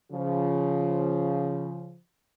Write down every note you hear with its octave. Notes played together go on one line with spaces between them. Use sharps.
C#3 F3